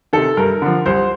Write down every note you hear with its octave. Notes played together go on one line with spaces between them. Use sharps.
C3 D#3 A4
G2 A#4
D3 F3
C2 C5